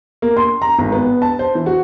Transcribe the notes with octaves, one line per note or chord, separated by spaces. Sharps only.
A#3
C6
A#5
G#1
B3
A5
C5
E3
F#4